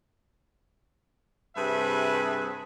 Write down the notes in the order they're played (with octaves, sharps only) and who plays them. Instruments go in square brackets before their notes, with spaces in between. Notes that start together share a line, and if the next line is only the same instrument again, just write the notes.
[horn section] G2 C3 G#4 B4 E5